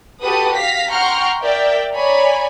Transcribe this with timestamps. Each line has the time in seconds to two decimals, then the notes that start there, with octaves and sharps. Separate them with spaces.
0.21 F#4 G4 A4 B4 D#6
0.56 F5 A#6 B6
0.90 F#5 G5 A#5 C6 C#6 F6
1.42 A#4 D5 E5 G5
1.93 C#5 D5 G#5 A#5 B5